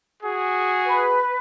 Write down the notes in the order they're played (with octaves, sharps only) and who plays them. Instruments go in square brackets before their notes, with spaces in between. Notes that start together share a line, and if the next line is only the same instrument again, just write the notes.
[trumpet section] F#4 G#4
[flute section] B4